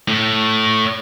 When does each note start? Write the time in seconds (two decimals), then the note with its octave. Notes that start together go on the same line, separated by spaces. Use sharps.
0.08 A2